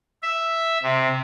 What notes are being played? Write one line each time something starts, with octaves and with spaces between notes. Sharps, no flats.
E5
C3